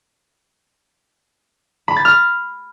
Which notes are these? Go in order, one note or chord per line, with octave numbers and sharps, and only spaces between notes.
B5
A6
F6